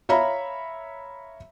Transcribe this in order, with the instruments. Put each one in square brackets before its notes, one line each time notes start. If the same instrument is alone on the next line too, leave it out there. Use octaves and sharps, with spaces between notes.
[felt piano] C#5 E5 F5 A#5 B5